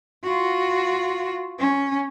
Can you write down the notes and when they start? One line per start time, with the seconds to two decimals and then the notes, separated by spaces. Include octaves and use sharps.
0.23 F4 F#4
1.59 C#4